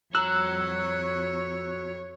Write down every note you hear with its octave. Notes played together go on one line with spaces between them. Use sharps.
F2 F#4 C#5 A#5 E6 F#6